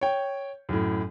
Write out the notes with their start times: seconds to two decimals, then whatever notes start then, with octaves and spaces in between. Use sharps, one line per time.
0.01 C#5 G5
0.69 F#2 A2